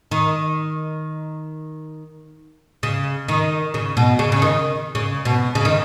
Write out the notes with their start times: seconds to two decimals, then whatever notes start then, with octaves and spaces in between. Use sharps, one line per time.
0.11 D#3
2.83 C#3
3.28 D#3
3.74 C#3
3.97 B2
4.19 C#3
4.32 C#3
4.42 D#3
4.95 C#3
5.25 B2
5.55 C#3
5.65 D#3